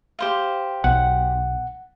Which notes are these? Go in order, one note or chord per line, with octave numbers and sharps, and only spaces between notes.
G4 C5 F5
B1 F#5